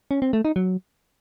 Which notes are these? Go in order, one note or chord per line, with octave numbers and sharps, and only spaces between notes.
C#4
C4
A3
D#4
F#3